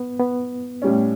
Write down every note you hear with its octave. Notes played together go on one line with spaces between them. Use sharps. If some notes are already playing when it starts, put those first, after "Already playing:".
Already playing: B3
B3
A2 G3 C#4